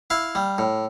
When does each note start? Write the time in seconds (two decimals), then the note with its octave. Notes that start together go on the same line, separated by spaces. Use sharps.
0.10 E4 F5
0.35 G3
0.58 A2